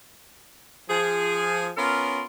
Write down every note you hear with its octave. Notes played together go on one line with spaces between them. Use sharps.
F3 G#4
B3 C#4 F4 A#4